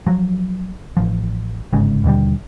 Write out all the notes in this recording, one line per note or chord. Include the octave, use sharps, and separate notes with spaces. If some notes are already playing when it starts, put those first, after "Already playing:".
F3 F#3
A1 F3
G1 G#2 C#3
D#2 B2 D3 G3